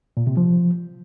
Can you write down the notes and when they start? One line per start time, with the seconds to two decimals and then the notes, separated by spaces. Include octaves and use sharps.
0.17 A#2
0.27 C3
0.37 F3